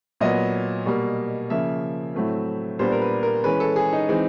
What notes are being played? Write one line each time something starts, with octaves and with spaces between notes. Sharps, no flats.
A#2 F#3 B3 D#5
B2 G3 A#3
C#3 F3 A#3 E5
A2 F#3 A3 C4
A#2 G3 B3 D4 C5
A#4
B4
A#4
E3 G#3 C#4 B4
A4
G#4
D#4
E3 G#3 C4 D#4